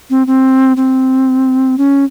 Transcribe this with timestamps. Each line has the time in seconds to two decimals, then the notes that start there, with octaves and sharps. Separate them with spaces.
0.10 C4
0.27 C4
0.77 C4
1.78 C#4